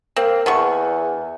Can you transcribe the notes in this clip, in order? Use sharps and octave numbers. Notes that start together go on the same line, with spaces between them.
A#3 C4
E2 D3 B3 C#6